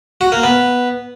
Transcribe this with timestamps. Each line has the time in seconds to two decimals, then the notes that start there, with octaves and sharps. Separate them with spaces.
0.21 F#4
0.32 A#3
0.43 B3